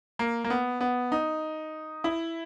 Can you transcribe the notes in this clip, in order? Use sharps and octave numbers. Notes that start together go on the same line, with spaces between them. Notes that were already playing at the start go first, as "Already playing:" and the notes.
A#3
A#3
B3
B3
D#4
E4